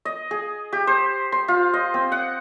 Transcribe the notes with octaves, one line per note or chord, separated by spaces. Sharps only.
D#5
G#4
G4
C5
C6
F4
D#5
C4
F#5